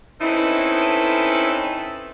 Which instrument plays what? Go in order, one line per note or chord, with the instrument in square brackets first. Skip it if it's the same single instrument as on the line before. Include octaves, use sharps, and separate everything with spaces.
[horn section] C4 C#4 D#4 E4 A4 B4